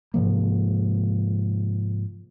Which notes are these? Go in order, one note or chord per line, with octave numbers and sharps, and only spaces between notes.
G#2 C3 F3 A#3